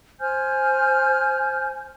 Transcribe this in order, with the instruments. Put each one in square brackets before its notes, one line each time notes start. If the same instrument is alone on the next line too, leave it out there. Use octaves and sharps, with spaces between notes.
[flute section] C5 G#5 F6 G6